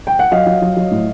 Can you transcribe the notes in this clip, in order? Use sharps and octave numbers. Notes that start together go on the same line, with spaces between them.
G5
F#5
F#3 D#5 F5
F#3
F#3
F#3
A2